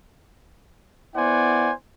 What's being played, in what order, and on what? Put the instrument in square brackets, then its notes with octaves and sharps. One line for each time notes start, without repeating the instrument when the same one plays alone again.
[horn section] B3 E4 C5 D5 F#5 G#5